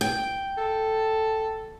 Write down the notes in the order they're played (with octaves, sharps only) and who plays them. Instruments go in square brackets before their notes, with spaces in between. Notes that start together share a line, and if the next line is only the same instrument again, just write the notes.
[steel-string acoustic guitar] G5
[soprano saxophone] A4